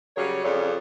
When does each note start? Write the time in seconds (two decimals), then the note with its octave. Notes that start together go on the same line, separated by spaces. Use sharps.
0.16 C#3 F#3 G3 A#4 C#5
0.43 F2 C#3 C#4 C#5 D5